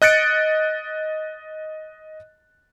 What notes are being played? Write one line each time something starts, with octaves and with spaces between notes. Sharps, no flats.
D#5 F#6 A6 C#7 D7